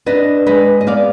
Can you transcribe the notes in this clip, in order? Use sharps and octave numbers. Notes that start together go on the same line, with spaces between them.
D4 B4 D#5
G#3 B4 D#5
D#5
B3 D5 F5